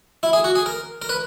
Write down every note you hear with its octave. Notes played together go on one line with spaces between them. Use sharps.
E4
G#4
F#4
G#4
A#4
A#4
B4